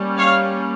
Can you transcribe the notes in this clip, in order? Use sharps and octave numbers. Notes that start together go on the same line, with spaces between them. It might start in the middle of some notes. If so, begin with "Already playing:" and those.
Already playing: G3 A#3 C#4
C#5 F5